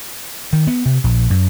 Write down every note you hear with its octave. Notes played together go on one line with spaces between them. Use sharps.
D#3
B3
C3
A#1
F#2